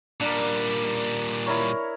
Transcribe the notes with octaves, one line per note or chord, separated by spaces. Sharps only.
A#2 G3 D4 A#4
E4 A#4 C#5